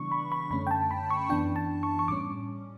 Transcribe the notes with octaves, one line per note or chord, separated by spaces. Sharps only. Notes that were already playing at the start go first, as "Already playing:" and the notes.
Already playing: C#3 E3 G3 B3 D4 C#6
B5
B5
F#2 D3 A3 C#4 B5
G5
A5
B5
C#6
F#2 E3 B3 D4 G5
A5
C#6
C#6
A2 G3 C#4 D6